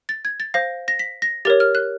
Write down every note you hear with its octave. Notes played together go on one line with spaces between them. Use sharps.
A6
G#6
A6
C5 F5 A#6
A#6
B6
A#6
G4 A#4 C#5 A6
F6
F#6